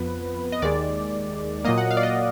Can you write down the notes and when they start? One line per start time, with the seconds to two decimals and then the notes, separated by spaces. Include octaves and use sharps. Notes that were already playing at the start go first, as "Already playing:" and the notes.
Already playing: F2 F3 B3 B4
0.52 D#5
0.62 D#2 D#3 G#3 D5
1.64 A#2 F#3 A#3 D#5
1.78 F#5
1.91 F5
1.97 D5
2.03 D#5